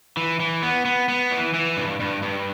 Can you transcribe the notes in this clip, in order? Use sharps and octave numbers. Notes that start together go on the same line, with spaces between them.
E3
E3
B3
B3
B3
E3
E3
G2
G2
G2